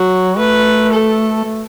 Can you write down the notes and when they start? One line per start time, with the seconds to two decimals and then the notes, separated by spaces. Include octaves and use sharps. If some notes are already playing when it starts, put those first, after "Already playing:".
Already playing: F#3 F#4
0.38 A3 B4
0.92 A4
1.44 A3